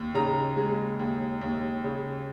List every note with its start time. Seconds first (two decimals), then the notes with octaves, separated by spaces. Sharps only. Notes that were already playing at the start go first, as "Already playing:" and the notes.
Already playing: D#2
0.14 C#3 A#5
0.57 G#3
0.99 D#2
1.41 D#2
1.84 C#3